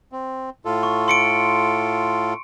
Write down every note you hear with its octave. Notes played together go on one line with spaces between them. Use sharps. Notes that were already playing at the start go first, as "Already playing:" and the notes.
C4
A2 F4 A4
C#6
C6 C#7 D7